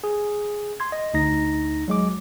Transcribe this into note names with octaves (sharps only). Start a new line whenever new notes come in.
G#4
C6 G#6
D#5
D2 D#4 A#6
F#3 G#3 D6